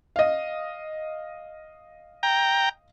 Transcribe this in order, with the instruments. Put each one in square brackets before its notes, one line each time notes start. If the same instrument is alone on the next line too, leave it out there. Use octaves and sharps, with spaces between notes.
[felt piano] D#5 F5
[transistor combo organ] G5 A#5